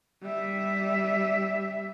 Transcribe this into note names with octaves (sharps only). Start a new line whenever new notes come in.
G3 E5